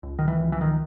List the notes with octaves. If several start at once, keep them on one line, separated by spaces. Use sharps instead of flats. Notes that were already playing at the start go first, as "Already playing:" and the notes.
C#2
D#3
E3
C#2
E3
D#3